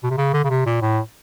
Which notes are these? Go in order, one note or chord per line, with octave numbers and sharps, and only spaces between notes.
B2
C3
C#3
D3
C#3
C3
A#2
A2